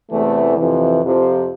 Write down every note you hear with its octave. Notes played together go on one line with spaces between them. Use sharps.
E2 C3 E3 A3
F2 C3 E3
F2 C3 F3